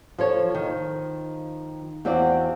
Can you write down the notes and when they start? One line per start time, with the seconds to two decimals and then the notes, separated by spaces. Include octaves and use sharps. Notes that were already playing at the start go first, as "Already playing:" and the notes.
0.18 F3 A4 C#5
0.51 D#3 F3
2.05 E2 C4 F4 F#4 D5